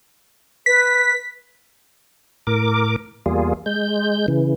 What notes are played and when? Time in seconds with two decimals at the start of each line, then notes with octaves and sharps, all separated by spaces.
0.66 B4 B6
2.47 A2 A#4 D6
3.26 E2 G3 A#3 F4 G#4
3.66 G#3 G6
4.28 C#3 E3